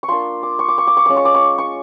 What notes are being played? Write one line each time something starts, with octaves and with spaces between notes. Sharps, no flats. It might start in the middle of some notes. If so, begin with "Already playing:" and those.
C#6
A#3 D4 F4 C6
D6
C#6
D6
C#6
D6
C#6
G#3 C#4 F4 D6
C#6
D6
C#6
C#6